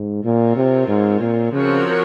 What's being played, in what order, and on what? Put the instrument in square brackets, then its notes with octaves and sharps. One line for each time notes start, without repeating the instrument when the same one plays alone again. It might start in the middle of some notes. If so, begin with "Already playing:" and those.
Already playing: [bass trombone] G#2
[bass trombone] A#2 [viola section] C4 F4 A#4 C#5
[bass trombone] C3
G#2
A#2
[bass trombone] C#3 [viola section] F3 C4 F#4 A#4 C#5